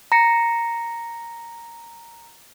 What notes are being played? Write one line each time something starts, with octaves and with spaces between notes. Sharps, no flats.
A#5 A#6 C#7